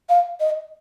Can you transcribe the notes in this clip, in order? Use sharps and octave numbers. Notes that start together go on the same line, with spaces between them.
F5
D#5